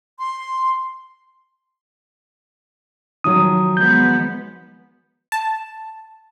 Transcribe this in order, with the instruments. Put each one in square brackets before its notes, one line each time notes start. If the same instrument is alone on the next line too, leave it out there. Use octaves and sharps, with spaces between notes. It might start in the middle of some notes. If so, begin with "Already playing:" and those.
[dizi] C6
[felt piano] D#3 F3 F#3 [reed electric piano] D#6
[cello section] G#3 B3 [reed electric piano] G6
[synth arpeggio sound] A5